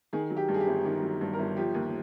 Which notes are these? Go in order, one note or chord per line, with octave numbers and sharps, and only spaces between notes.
D#3 G#4
F#3
G4
G2
G#4
G4
G1
D#3
F#3
G2
A#4
G1
F3 G4
D#2